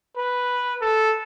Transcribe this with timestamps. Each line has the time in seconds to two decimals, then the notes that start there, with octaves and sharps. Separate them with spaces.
0.17 B4
0.82 A4